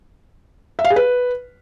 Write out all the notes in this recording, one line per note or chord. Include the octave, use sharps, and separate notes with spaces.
E5
F5
G#4
B4